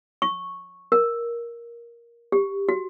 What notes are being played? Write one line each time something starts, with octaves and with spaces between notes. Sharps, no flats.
C#6
A#4
G4
F#4